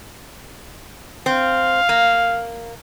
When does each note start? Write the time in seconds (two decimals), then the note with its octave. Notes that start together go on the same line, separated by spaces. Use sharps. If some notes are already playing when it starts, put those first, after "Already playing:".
1.26 C4 F5
1.89 A#3